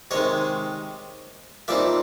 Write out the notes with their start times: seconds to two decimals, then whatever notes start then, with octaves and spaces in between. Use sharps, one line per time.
0.11 C3 D#3 G#3 C#5 D#5
1.68 A#2 G3 C4 D#4 D5 E5